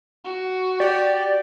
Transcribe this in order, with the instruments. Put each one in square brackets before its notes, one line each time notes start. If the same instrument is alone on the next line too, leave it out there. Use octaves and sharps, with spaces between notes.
[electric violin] F#4
[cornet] G4 [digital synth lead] D5